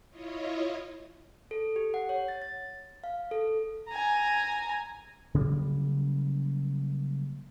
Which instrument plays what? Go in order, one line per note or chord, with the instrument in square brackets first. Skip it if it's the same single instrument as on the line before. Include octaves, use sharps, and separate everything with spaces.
[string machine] E4 F4 C#5 D#5
[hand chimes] A4
G4
F#5
C#5
A6
A6
F5
A4
[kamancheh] G#5 A#5
[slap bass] C#3 F#3 G3 A#3